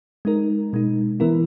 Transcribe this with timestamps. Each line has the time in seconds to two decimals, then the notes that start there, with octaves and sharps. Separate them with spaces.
0.25 G#3 D#4 A#4
0.73 B2 G#3 D#4
1.20 E3 B3 E4 A#4